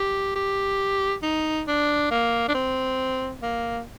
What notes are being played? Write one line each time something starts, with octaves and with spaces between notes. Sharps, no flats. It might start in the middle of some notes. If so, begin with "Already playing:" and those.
Already playing: G4
G4
D#4
D4
A#3
D4
C4
A#3